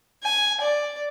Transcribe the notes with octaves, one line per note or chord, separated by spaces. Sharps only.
G#5
D5